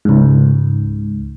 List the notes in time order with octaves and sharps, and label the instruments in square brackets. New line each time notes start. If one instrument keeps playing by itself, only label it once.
[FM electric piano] C#2 G#2